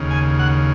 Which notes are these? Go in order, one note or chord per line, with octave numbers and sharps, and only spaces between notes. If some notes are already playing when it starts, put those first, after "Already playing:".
Already playing: D#2 C#3
G#5
F#5